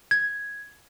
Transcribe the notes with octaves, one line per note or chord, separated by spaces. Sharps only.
G#6